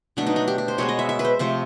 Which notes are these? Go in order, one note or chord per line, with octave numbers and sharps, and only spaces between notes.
B2 F#3 A3 D4
D#4
D4
G4
G4
C5
B2 G#3 B3 C#5
D#5
E5
E5
B4
C5
C3 F3 A3 C5